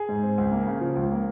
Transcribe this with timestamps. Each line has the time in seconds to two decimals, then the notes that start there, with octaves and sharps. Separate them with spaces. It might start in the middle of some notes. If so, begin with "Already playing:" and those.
Already playing: G#4
0.09 G#2
0.23 C4
0.38 C#2
0.52 A#3
0.66 C#3
0.81 F3
0.96 C#2
1.12 A#3